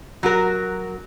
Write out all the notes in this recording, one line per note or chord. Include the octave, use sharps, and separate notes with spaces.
F#3 F#4 A#4